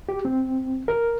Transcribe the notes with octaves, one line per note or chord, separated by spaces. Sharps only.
G4
C4
A#4